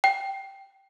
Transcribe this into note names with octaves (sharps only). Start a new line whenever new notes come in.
G5